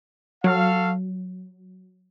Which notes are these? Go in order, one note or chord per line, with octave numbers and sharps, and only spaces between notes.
F#3 F#4 A4 F5